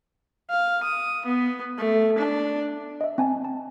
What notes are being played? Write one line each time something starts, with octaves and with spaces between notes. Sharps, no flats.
F5
D#6
B3
A3
D4
D#5 E5
C4 G#5 A5
A5